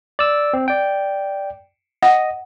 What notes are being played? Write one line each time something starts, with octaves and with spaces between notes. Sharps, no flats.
D5 E6
C4
D5 G5
D#5 F#5